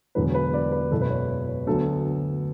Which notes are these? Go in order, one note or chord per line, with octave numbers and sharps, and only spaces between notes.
E1 E2 D3 F#3 B4
B4
D5
B4
F#1 E2 B2 F#3 B3 A4
B4
C#5
C#5
D2 D3 F#3 B3 A4